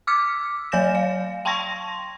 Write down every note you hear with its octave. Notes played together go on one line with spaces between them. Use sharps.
D6 E6 F6 B6 C#7
F#3 C#5 G#5 G6 A#6 E7
F5
G5 A5 C6 C#6 G#6 A#6